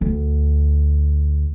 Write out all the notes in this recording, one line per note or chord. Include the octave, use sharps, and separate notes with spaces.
D2